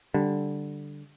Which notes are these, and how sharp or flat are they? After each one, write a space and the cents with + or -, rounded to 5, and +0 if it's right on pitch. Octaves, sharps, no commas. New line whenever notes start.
D3 +0 G3 +0